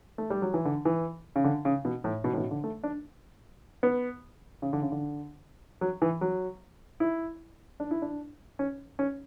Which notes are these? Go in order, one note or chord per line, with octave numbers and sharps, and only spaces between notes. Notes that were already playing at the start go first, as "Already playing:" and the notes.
A3
G3
F#3
E3
D3
E3
C#3
D3
C#3
B2
A2
B2
A2
B2
D3
A3
D4
B3
C#3
D3
C#3
D3
F#3
E3
F#3
E4
D4
E4
D4
C#4
C#4